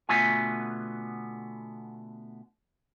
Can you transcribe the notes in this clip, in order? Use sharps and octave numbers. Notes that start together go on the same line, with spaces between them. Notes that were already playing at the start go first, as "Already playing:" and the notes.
B2 D3 A3 B3 F4 G#5